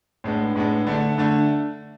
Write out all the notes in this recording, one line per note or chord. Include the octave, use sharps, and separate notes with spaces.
A2 G#3 B3 D4
A2 G#3 B3 D4
D3 A3 D4
D3 A3 D4